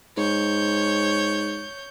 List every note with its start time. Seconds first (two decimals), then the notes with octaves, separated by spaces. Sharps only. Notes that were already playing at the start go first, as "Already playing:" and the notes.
0.17 G#2 C#5 G6